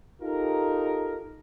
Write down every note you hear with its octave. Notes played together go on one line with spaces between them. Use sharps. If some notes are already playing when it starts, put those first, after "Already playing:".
D#4 F4 G4 A4 A#4